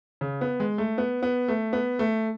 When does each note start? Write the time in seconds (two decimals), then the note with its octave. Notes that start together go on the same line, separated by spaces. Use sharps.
0.21 C#3
0.41 B3
0.60 G#3
0.78 A3
0.98 B3
1.23 B3
1.48 A3
1.73 B3
1.99 A3